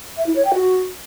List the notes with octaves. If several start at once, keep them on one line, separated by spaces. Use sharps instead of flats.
E5
E4
C#5
G5
F#4